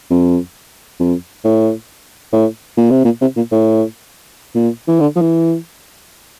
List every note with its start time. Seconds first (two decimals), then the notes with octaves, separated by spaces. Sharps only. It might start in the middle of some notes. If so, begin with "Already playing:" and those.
0.11 F2
1.00 F2
1.44 A2
2.33 A2
2.77 A#2
2.91 C3
3.05 A#2
3.21 C3
3.36 A#2
3.52 A2
4.55 A#2
4.88 E3
5.00 D3
5.16 F3
5.21 E3